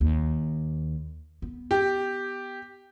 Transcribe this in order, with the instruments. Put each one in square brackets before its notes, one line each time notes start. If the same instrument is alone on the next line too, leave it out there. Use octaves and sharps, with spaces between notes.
[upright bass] D#2
B3
[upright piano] G4